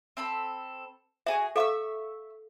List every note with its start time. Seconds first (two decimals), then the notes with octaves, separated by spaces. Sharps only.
0.17 C4 A4 B5
1.26 F#4 G#4 E5 G#5
1.56 A4 E5 F5 C#6 E6